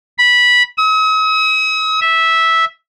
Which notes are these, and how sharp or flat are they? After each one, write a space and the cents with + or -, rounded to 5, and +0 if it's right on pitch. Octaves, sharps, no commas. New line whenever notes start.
B5 -15
D#6 +45
E5 -10